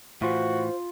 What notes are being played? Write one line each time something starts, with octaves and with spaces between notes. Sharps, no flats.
A2 E3 F4 F#4 C5